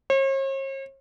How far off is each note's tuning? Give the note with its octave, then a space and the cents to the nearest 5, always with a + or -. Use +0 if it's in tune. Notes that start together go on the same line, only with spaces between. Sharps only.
C#5 -45